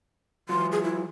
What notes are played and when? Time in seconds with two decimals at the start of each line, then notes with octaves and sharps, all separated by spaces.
0.49 E3 F#3 F4 C6
0.72 G#4
0.84 E4